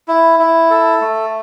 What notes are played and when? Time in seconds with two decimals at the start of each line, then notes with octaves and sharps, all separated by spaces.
0.08 E4
0.39 E4
0.70 A4
1.01 A3